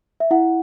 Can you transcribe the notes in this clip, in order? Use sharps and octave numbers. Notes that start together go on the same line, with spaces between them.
E5
E4 F#5